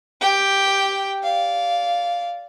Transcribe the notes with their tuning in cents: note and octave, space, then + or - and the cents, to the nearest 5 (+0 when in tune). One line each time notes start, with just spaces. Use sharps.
G4 +0 G5 +0
D5 -15 F5 +0